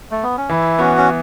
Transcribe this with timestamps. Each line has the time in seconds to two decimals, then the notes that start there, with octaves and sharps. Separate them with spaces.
0.11 A3
0.23 B3
0.37 C#4
0.49 E3 E4
0.79 B3 C#4 F#4
0.97 C#4